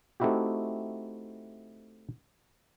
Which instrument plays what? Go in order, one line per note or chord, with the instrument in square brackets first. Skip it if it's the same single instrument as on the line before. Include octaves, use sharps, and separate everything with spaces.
[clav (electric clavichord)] A3 C4 D#4 E4 F#4 G4